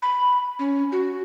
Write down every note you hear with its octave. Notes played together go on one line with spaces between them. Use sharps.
B5
C#4
F#4